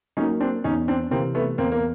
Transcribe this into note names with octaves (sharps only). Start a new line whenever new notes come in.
F#3 A#3 C#4 D#4
C4 D4
E2 C#4 D#4
C4 D4
C3 E3 A#3 C4
A3 B3
E2 A#3 C4
A#3